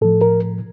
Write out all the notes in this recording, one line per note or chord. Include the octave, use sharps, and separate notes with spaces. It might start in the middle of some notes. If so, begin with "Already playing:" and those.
A2 F3 A4
A#4